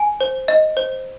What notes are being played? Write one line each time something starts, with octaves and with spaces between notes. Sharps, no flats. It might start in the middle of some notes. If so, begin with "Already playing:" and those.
Already playing: G#5
C5
D#5
C5